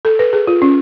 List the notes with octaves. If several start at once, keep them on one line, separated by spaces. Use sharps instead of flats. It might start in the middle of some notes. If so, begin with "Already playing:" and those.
A4
B4
G#4
F4
C#4